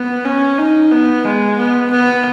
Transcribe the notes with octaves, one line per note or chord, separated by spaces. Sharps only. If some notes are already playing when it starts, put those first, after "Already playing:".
Already playing: B3
C#4
D#4
B3
G#3
B3
B3